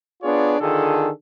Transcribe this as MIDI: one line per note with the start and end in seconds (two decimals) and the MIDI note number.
0.23 0.56 59
0.23 0.56 62
0.23 0.56 65
0.23 0.56 68
0.23 0.56 73
0.23 0.56 74
0.61 1.09 50
0.61 1.09 51
0.61 1.09 65
0.61 1.09 68
0.61 1.09 69